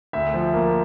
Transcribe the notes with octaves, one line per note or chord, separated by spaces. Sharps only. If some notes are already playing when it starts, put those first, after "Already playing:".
D2 E5
F3
A#3